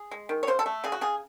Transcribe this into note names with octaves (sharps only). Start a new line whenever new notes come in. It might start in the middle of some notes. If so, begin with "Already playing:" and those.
Already playing: G#4
G#3
D#3
C#5
C#3 C5
A4
A3
C#3 G#4
F#4
C#3 G#4